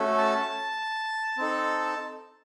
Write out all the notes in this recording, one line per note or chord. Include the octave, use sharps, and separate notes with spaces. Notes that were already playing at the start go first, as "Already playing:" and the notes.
Already playing: A3 C#4 F#4 A4
A5
C4 D#4 A4